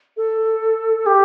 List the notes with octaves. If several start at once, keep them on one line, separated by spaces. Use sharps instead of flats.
A4
G4